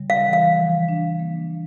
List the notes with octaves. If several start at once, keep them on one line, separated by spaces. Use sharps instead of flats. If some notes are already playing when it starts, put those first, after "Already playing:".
Already playing: C#3 G3
F5
E3
F5
F3
D4
A#3